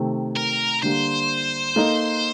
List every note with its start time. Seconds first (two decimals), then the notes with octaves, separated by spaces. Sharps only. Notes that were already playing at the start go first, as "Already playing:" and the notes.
Already playing: C3 D#3 A3 C4
0.37 A#4
0.83 D3 G3 A#3 C5
1.76 A#3 D#4 A4 D#5